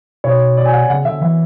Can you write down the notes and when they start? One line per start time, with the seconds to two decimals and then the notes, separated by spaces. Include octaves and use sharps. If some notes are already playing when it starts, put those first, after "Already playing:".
0.24 B2 C#5
0.57 D5
0.66 G#5
0.73 F#5
0.90 C#3 F#5
1.05 D3 E5
1.21 E3 E5